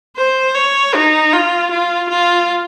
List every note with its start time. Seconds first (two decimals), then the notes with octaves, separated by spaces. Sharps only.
0.17 C5
0.54 C#5
0.94 D#4
1.33 F4
1.71 F4
2.10 F4